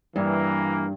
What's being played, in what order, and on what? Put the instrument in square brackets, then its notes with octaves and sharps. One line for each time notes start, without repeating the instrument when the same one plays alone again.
[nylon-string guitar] G2 [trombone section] E3 A#3